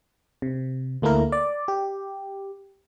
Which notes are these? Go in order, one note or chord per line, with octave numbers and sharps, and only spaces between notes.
C3
D2 A3 A#3 E4 A#4
D5
G4